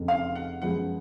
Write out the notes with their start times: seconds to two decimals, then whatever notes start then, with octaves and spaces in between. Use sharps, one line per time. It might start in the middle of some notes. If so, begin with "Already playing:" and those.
Already playing: F1 F2 C#3
0.08 F5
0.35 F#5
0.62 F#2 F3 G#3 B3 F#5